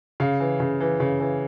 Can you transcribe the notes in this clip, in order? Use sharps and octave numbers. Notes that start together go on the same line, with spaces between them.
C#3 F5
E3
C#3
E3
C#3
E3